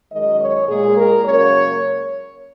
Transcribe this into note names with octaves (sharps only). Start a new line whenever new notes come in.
F#2 D#3 G#3 D#5
C#5
A#2 G#3 G#4
A#4
F#2 C#3 A#3 C#5